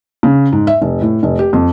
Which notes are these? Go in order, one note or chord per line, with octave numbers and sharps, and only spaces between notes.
C#3
G#2
E5
F1
A2
F1
G4
F2